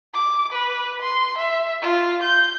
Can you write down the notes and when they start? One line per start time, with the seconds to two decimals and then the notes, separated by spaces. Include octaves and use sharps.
0.14 D6
0.53 B4
1.02 C6
1.38 E5
1.82 F4
2.23 G6